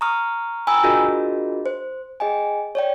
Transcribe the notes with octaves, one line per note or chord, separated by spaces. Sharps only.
A#5 C#6 D#6 F6
G5 G#5 A#5 B5 D#6 E6
D4 F4 F#4 G#4 A#4 D#5
C5
G#4 D#5 G5 G#5
C#5 D5 G5